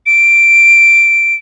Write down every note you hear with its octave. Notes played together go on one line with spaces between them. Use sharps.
D7